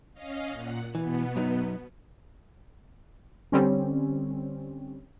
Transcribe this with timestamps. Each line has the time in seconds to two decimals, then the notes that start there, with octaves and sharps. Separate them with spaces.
0.14 C#4 D#5 F5
0.51 A#2 F#5
0.95 B2 E3 B3
1.36 F#2 F#3 D#4
3.52 D3 G3 C4 C#4